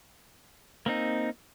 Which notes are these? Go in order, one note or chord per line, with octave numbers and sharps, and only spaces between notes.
A#3 C4 D#4